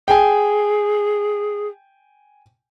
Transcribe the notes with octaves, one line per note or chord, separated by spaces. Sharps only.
G#4 G5 G#5